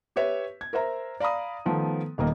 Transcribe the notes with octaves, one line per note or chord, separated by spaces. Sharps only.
G4 B4 C#5 E5
G#6
A#4 C5 E5 A#5
D5 F5 A#5 B5 D#6
D#3 F3 A3 B3
D#1 D#3 A#3 D#5